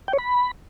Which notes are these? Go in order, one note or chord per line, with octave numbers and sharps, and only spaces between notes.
G5
C#5
B5